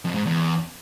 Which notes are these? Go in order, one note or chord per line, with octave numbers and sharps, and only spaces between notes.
F2
G#2
E2